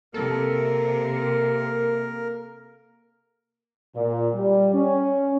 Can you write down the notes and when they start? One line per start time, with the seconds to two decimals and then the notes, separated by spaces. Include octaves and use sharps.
0.14 C3 A#3 A4 A#4
3.95 A#2
4.34 G3
4.74 C#4